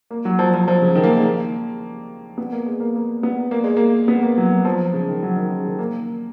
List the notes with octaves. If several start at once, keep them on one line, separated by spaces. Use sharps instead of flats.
A#3
F#3
F3
F3
F3
C#3
D#3
A#3
G#3
A#3
B3
A#3
G#3
A#3
A#3
B3
A#3
G#3
A#3
B3
A#3
F#3
F#3
F3
C#3
D#3
F#3
D#3
C#3
D#3
A#3